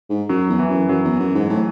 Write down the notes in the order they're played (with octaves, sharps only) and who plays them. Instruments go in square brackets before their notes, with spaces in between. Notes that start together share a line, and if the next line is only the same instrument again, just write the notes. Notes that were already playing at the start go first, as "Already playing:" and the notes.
[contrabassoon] G#2
[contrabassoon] F#2 [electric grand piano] F#3
[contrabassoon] E2
[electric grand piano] E3
[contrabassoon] F#2
[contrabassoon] F#2 [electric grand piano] F#3
[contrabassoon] E2
F#2
G#2
A2